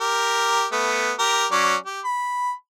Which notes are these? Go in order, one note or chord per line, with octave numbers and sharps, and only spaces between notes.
G4 A#4
A3 B3
G4 A#4 A#5
F#3 C#4 D5
G4
B5